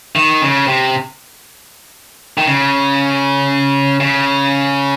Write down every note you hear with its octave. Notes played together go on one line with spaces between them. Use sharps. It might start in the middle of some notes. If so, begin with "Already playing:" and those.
D#3
C#3
C3
D#3
C#3
C#3